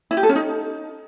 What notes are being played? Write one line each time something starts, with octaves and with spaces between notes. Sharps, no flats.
E4
G4
A4
C#4
D#4